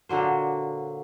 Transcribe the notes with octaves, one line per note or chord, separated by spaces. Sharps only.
A#2 D3 F#3 C5